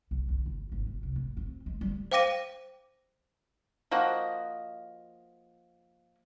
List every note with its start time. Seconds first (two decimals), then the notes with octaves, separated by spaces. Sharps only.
0.11 B1
0.29 D3
0.46 G1
0.72 G#1
0.87 G1
1.03 C2
1.16 G#1
1.37 C4
1.66 G#3
1.81 G3
2.11 C5 F5 G5 D6 A#6 D#7
3.91 F3 A#3 F#4 D#5